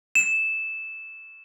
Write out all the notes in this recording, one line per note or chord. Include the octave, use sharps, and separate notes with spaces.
E7